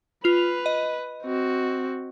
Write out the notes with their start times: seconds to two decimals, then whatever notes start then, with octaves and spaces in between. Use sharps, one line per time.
0.24 F4 B4 F7
0.66 D#5
1.23 C4 F#4